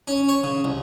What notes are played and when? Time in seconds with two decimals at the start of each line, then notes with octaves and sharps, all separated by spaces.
0.08 C#4
0.29 C#5
0.43 C#3
0.64 C2